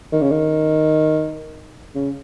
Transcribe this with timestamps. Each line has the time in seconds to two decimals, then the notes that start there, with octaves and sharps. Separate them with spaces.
0.12 D#3
0.21 C#3
0.31 D#3
1.95 C#3